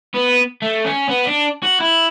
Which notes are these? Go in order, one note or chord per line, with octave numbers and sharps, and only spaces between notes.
B3
A3
C#4
B3
D4
F#4
E4